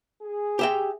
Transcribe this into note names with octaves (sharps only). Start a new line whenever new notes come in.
G#4
G4 E5 G5